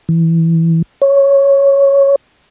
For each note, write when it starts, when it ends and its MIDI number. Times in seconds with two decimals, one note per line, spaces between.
0.09 0.82 52
1.02 2.16 73